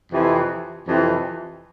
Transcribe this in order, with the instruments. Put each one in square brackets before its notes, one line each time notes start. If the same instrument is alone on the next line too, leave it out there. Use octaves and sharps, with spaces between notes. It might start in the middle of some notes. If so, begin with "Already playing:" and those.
[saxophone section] F2 C3 E3
F2 C3 E3